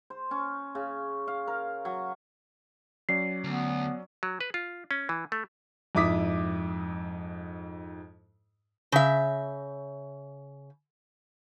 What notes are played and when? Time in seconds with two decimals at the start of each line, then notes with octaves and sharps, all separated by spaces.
0.10 C5
0.31 C#4
0.75 C#3
1.28 F5
1.47 A#4
1.85 F#3
3.09 F#3 C#4 D5 C7
3.44 D2 B3
4.23 F#3
4.41 B4
4.54 F4
4.91 C#4
5.09 E3
5.32 A3
5.95 F2 G#2 E4 D6 D#6 B6
8.92 C#3 E5